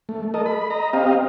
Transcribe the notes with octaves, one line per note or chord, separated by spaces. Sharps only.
A3
A4 A#4 D#5
B5
D#5 A#5
C4 G4 D#5 F5